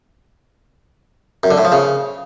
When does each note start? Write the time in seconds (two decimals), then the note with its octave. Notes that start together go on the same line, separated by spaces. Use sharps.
1.43 F#2
1.51 D3
1.58 A2
1.65 F3
1.72 C#3